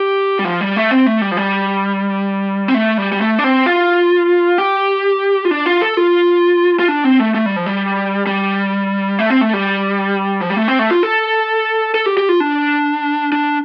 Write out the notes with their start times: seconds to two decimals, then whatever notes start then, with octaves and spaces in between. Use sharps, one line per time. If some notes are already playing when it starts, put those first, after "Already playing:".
Already playing: G4
0.39 G3
0.45 F3
0.61 G3
0.76 A3
0.91 C4
1.06 A3
1.21 G3
1.32 F3
1.37 G3
2.68 C4
2.74 A3
2.98 G3
3.12 G3
3.21 A3
3.39 D4
3.44 C4
3.66 F4
4.58 G4
5.45 F4
5.51 D4
5.66 F4
5.82 A4
5.97 F4
6.79 F4
6.88 D4
7.04 C4
7.19 A3
7.34 A3
7.46 G3
7.56 F3
7.66 G3
8.27 G3
9.19 A3
9.30 C4
9.41 A3
9.53 G3
10.41 F3
10.49 G3
10.56 A3
10.68 C4
10.79 A3
10.91 F4
11.03 A4
11.95 A4
12.06 G4
12.17 G4
12.29 F4
12.40 D4
13.32 D4